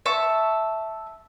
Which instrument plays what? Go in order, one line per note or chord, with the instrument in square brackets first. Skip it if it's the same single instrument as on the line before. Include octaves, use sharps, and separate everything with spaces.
[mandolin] E5 A5 C#6